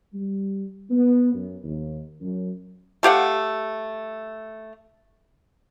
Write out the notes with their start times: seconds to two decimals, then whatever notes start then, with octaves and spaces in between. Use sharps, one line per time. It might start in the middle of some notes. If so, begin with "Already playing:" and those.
0.13 G3
0.90 B3
1.33 F#2
1.64 D#2
2.21 F#2
3.03 A3 G4 F5 F#5